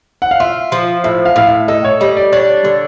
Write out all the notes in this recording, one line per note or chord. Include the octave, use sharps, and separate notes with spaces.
F#5
F5
F4 E5
F3
A2 E5
F5
A2 F5
E5
A4 D#5
C#5
G3 D#5
D5
D4 C#5
D3